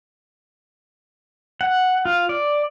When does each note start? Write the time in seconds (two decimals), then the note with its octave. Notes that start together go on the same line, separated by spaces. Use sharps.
1.61 F#5
2.05 F4
2.29 D5